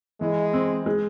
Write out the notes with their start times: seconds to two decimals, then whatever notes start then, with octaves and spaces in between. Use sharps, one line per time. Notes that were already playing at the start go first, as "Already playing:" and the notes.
0.20 E3 G#3
0.53 C4
0.86 G#3